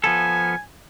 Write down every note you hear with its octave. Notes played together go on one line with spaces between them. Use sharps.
F3 B3 A4 G#5